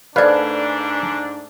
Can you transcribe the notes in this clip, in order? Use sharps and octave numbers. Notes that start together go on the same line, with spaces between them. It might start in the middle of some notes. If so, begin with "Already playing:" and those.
G#2 A3 D4 A4 B4 C5 D5 F5